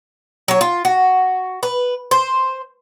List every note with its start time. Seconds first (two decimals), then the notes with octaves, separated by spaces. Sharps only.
0.48 F#3 C#5
0.61 F4
0.85 F#4
1.63 B4
2.11 C5